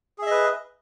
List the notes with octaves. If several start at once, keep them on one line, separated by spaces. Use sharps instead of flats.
G#4 B4 D#5 E5